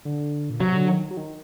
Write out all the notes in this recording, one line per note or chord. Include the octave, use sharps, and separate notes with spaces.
D3
A#2
C3 F#3
D3
D#3
F#3
D#3